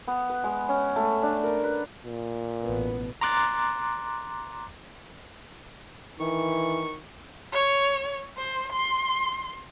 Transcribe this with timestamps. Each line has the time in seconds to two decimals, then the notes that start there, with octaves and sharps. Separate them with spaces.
0.07 B3
0.29 B4
0.44 G#3
0.69 C#4
0.96 A3
1.22 D4
1.43 A#4
1.63 B4
2.06 A#2
2.63 A1 B2 B3
3.21 A#5 C6 D6 F#6 A6
6.20 D#3 E3 C#6
7.53 C#5
8.37 C5
8.72 C6